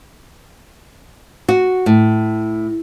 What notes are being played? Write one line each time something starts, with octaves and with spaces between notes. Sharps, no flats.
F#4
A2